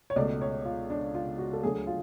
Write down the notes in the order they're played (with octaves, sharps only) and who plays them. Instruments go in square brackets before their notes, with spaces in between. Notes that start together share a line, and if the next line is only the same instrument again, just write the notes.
[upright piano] C#5
C#2 B2 A3 D5
C#5
F4
D4
F4
F#4
A4
D2 D3 F#3 A3 G#4
F4